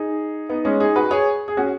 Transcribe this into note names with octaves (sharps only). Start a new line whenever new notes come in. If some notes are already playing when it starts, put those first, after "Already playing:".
Already playing: D#4 G#4
B3 D#4
G#3 C#4
D#4 G#4
F#4 B4
G#4 C#5
G#4
C#4 F#4